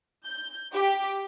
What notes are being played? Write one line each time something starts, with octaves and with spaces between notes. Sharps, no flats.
G6
G4